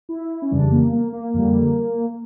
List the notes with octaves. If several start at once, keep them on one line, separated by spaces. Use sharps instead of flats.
E4
C#4
F2 C#3 E3 G3 D4
A#3
A#3
A#3
F2 D3 G3